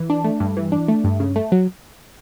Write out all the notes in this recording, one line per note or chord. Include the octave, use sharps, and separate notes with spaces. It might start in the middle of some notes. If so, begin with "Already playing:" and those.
Already playing: E3
D4
A3
G2
E3
D4
A3
G2
C#3
A3
F#3